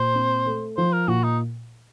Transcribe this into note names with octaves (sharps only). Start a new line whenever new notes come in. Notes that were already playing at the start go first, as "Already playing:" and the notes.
Already playing: A#2 C5
C4
A3
F3 C5
A#4
A#2 F#4
D#4